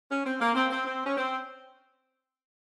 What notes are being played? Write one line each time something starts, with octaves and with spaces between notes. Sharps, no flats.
C#4
C4
A#3
C4
C4
C4
C#4
C4